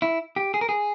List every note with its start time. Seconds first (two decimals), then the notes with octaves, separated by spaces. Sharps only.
0.02 E4
0.36 G4
0.54 G#4
0.61 A#4
0.69 G#4